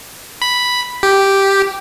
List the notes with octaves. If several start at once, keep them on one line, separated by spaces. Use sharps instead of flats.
B5
G4